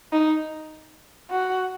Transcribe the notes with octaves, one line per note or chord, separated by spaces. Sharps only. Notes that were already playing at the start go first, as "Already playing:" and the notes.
D#4
F#4